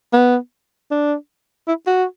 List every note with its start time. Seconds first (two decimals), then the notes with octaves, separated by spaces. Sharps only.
0.13 B3
0.91 D4
1.68 E4
1.87 F#4